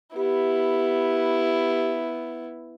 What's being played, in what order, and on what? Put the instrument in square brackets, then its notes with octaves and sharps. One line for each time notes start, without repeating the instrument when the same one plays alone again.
[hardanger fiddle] B3 E4 [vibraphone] G4